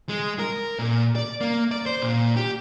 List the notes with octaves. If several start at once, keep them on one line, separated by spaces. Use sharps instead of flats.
G#3
A#4
A#2
D5
A#3
D5
C5
A#2
G4